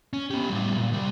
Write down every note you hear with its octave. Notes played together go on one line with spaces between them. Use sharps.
C#4
B3 G4
A2 G3
G2 A#2
C2 G3